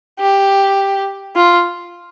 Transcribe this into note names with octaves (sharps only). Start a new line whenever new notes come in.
G4
F4